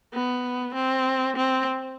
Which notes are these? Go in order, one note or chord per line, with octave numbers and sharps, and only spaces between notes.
B3
C4
C4